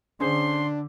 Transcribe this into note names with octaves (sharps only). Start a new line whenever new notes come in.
D3 C#4 D4 G#4 C5 C6